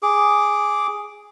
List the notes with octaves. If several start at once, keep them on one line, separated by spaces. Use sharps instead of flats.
G#4 D6